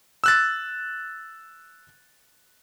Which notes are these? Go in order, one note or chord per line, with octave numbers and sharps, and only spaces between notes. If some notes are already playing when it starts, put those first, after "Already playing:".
E6 F#6 A6